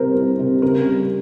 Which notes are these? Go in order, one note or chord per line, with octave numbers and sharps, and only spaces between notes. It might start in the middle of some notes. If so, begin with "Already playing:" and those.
Already playing: C3 G3 A#4 C5
C2
C3
C#3 A#4
G3